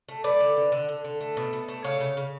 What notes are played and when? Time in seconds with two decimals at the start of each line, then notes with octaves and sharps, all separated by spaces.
0.09 A3
0.24 A3 B4 D5
0.40 D3
0.57 D3
0.72 D3
0.89 D3
1.04 D3
1.21 A3
1.37 B2
1.53 B2
1.68 A3
1.84 C#3 C#5 F5
2.00 C#3
2.17 C#3